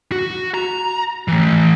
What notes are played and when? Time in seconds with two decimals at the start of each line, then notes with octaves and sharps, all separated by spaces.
0.12 F#4
0.54 A#5
1.28 E3 A3